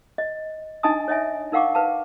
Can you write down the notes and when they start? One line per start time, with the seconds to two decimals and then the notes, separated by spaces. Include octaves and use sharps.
0.18 D#5
0.83 D4 D#4 D#5 G#5 A5 D#6
1.08 C#5 D#5 E5 G#5
1.52 D#4 A#4 F5 F#5 C#6 D6
1.75 B4 F5 A5